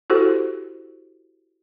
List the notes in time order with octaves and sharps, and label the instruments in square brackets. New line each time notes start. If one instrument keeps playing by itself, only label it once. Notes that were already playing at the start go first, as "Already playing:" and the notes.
[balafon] E4 F#4 G4 A4 C5